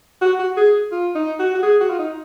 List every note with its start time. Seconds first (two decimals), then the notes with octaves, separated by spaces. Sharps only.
0.21 F#4
0.39 F#4
0.57 G#4
0.92 F4
1.15 D#4
1.40 F#4
1.55 F#4
1.63 G#4
1.81 F#4
1.90 F4
1.99 D#4